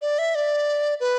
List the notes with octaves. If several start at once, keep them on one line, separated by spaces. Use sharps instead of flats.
D5
E5
D5
B4